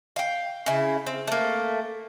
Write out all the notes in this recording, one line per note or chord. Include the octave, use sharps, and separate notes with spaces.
F5 G5
C#3 E4
C4
A3 A#3